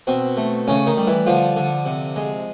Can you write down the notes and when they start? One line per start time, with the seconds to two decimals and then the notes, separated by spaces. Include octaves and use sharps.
0.07 B2 C4
0.37 A3
0.68 A2 C#3 C#4
0.87 D#3 D#4
0.97 G3
1.07 E3 E4
1.26 D3 F3 F4
1.56 D3
1.86 C3
2.16 G#3